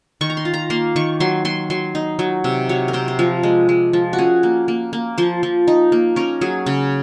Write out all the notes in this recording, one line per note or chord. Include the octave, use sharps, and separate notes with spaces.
D#3 C#6
A#5
C6
F4
A#5
A#3 C6
D#3 C#6
F#3 C6
F#3 C6
F#3 C6
D#4
F#3
C3
F#3 C#5
A#4
C3 C5
C5
F3 A#4
G#3
G#3
F3
F#4
C#4 G#4
A#3
A#3
A#3
F3 C5
F3
D#4
A#3
C#4 A#4
F#3 G#4
C#3